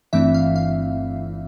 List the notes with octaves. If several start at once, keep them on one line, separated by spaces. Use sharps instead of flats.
G1 G2 E3 A3 C4 E5
F5
F5